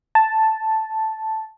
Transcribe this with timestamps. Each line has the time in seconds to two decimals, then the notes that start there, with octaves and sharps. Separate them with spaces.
0.15 A5